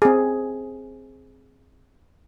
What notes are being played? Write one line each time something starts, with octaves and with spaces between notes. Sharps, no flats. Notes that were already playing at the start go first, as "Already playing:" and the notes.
C4 G#4